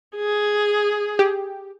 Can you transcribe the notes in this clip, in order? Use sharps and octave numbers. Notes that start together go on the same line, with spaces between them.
G#4
G4